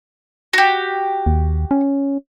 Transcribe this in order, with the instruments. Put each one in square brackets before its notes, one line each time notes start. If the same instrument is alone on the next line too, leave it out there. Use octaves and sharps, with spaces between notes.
[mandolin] F#4 G4
[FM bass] D#2
C#4